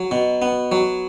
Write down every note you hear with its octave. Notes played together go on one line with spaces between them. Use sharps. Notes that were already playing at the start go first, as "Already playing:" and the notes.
Already playing: F#3
B2
B3
F#3